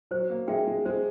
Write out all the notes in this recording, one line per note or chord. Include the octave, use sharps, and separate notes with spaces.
F#3 C5
A#3
G#3 E5 G5
G#3
G#3 C5